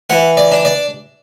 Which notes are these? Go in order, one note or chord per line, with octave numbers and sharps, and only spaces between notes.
E3 F#5
D5
D4
D5